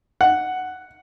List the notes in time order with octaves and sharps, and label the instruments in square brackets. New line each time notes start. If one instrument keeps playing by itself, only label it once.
[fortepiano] F#5